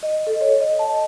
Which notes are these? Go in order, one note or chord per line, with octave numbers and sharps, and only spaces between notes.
D#5
A4
C#5
D#5
A5